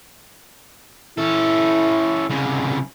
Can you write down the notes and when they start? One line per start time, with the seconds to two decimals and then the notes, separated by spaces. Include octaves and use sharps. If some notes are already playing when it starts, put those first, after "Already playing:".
1.18 C#4 E4 A4
2.30 C2 C#3